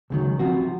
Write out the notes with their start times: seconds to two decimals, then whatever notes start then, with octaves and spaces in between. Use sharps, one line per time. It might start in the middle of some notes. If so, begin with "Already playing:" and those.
0.10 C#2 C3 D#3 F#3
0.39 C2 C3 F3 F#4